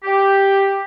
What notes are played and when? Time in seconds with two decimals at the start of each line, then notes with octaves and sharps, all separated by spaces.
0.04 G4